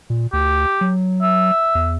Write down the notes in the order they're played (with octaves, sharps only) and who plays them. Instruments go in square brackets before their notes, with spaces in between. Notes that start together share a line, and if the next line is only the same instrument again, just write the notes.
[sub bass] A#2
[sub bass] D2 [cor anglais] G4
[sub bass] F#3
[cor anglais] E5
[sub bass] E2